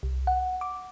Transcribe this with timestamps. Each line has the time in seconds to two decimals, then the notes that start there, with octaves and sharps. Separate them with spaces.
0.03 C2
0.27 F#5
0.61 D6